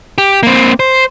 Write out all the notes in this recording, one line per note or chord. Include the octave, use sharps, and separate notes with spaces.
G4
A#3 C4
C5